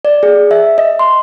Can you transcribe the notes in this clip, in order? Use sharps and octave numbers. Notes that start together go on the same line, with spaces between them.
D5
G#4
E5
D#5
C6